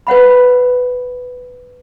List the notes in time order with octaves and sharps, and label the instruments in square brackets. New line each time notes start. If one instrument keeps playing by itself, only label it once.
[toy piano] B4 C#5 F#5 B5